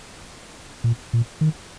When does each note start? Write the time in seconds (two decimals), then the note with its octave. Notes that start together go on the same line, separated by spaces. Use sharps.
0.84 A#2
1.13 A#2
1.41 D#3